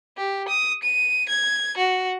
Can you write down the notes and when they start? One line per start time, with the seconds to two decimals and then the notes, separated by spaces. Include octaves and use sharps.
0.17 G4
0.48 D#6
0.83 D#7
1.29 G#6
1.77 F#4